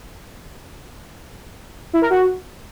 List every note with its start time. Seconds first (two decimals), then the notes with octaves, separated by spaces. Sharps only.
1.93 E4
2.02 A#4
2.10 F#4